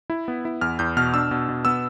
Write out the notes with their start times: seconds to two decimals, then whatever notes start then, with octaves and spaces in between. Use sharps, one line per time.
0.10 E4
0.28 B3
0.45 E4
0.61 E2 F6
0.79 E2 G6
0.97 B2 F6
1.14 D4 E6
1.31 B2
1.49 B2
1.65 B3 E6